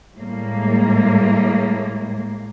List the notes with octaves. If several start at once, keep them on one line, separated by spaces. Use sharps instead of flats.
A2 G3 G#3 A#3